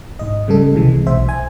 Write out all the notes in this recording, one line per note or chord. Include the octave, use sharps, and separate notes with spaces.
G#2 D#5
C#3 G3 G#3 A4
C2 C3 E3 G#3
B1 C5 E5
G#5